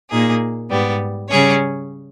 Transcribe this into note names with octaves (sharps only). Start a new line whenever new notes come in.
A#2 A#3 D#4 G#4
G#2 G3 B3
C#3 G3 C#4 G#4 C#5